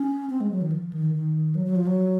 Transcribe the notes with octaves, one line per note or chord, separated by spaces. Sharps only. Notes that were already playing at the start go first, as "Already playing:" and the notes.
Already playing: C#4
C4
G#3
F#3
D#3
F3
D#3
D#3
F#3
F#3
F3
F#3